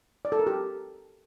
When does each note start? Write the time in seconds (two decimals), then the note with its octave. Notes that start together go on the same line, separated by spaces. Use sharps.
0.25 D5
0.32 A4
0.39 A#4
0.47 G4